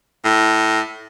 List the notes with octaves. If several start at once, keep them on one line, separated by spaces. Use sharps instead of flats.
A2